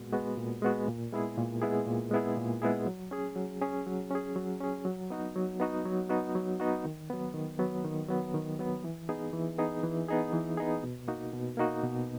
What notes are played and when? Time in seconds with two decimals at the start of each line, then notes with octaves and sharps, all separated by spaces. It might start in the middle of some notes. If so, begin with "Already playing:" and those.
Already playing: A#2 G#3 B3 F#4
0.13 G#3 B3 F#4
0.37 A#2
0.62 G#3 B3 F#4
0.88 A#2
1.13 G#3 B3 E4 G#4
1.38 A#2
1.62 G#3 B3 E4 G#4
1.86 A#2
2.11 G#3 B3 E4 G#4
2.37 A#2
2.62 G#3 B3 E4 G#4
2.87 F#3
3.11 C#4 G#4
3.36 F#3
3.61 C#4 G#4
3.86 F#3
4.11 C#4 G#4
4.36 F#3
4.60 C#4 G#4
4.85 F#3
5.10 B3 D#4 F#4
5.36 F#3
5.60 B3 D#4 F#4
5.85 F#3
6.09 B3 D#4 F#4
6.35 F#3
6.60 B3 D#4 F#4
6.85 D#3
7.10 F#3 B3
7.34 D#3
7.59 F#3 B3
7.84 D#3
8.09 F#3 B3
8.34 D#3
8.59 F#3 B3
8.84 E3
9.09 B3 D#4 G#4
9.33 E3
9.58 B3 D#4 G#4
9.84 E3
10.09 B3 D#4 G#4
10.33 E3
10.57 B3 D#4 G#4
10.83 B2
11.08 A#3 D#4 F#4
11.33 B2
11.57 A#3 D#4 F#4
11.83 B2